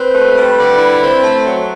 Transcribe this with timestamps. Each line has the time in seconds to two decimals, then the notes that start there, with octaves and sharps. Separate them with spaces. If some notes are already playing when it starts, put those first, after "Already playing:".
Already playing: C4 B4
0.13 A3
0.35 G3
0.57 D3
0.78 E4
1.00 C4
1.22 A3
1.44 F#3